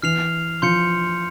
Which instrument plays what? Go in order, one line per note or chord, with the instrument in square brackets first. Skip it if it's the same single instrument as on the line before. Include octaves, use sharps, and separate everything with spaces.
[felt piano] E3 [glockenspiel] F6 C7 F7
[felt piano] F3 [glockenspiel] C6 G6 C#7